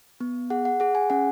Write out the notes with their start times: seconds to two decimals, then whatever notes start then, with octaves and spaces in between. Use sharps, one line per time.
0.20 B3
0.50 G#4 F#5
0.65 F#5
0.80 G#4 F#5
0.95 G#5
1.10 C#4 F#5